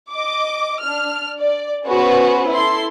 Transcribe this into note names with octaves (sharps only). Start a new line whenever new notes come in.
D#5 D6
D4 F6
D5
B3 C#4 F#4 G#4 B4 C5
E4 A4 C6